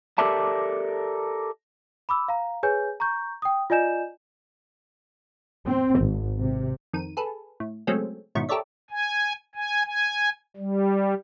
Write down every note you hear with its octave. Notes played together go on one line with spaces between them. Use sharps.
G4 A4 A#4 D5 E5 A5
B5 D6 E6
F5 A#5
G#4 B4 C#5 G#5 G6
A#5 C#6 G6
G5 D#6
F4 D5 D#5 G#5 G6 E7
C4
G#1
C3
F2 D#3 D#7
G#4 A4 B4
A2
C#3 F#3 G#3 A3 C4 C#4
G#2 B2 D#3 E4 C#5 C#6
G4 A4 A#4 C#5 D5 E5
G#5
G#5
G#5
G3